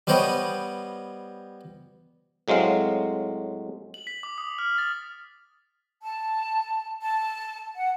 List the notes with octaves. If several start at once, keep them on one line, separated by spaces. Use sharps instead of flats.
G3 B3 C5 C#5 D#5 G5
A2 F#3 G#3 C4 F5
F#7
B6
D6
D#6
F6
A6
A5
A5
F#5